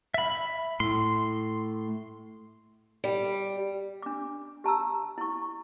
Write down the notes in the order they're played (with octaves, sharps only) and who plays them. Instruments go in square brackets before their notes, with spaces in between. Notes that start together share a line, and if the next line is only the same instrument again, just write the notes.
[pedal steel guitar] E5 B5
[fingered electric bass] A2 [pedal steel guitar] C6
[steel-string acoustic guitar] G3
[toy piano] D4 D6
G4 A5 A#5 E6
E4 C#6